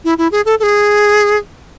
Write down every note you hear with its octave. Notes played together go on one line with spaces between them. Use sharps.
E4
E4
G#4
A4
A4
G#4